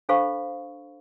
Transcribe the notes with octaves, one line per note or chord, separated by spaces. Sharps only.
D4 A4 C5 F5 B5 C#6